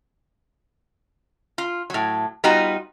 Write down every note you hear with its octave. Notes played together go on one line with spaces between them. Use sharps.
F4
A2 F#3
G3 B3 D#4 F4 F#4